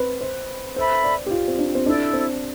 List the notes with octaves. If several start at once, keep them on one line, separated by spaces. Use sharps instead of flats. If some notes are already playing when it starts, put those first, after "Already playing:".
Already playing: C4 B4
C5
A4 C5 E5 B5
D5
G4
F4
C4
D4
C4
D4 E4 A4 D5
C4